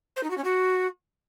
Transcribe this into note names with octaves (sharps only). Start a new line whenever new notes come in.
C5
D#4
F#4
C#4
F#4